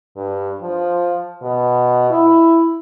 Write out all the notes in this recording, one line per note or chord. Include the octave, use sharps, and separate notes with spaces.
G2
F3
B2
E4